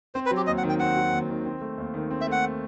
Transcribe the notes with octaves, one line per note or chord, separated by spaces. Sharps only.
C4 C5
B4
F#3
G4
D#2 D#5
F#5
D#3
G5
C4 F#5
F#3
D#2
D#3
C4
A3
D#2
D#3
C4
E5
A3 F#5